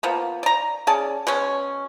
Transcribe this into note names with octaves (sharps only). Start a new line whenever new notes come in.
F3 A#3 B3
D5 A#5
C#4 G#4 D5 A5
B2 G#3 C#4